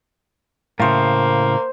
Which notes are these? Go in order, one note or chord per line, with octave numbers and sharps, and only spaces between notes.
A2 C#3 A#3 C5 F5